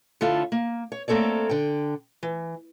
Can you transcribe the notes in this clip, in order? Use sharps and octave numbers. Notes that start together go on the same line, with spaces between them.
D3 E4 F4 A4 C#5
A#3
C#5
A3 A#3 C4 A4 C#5 D5
D3 G5
E3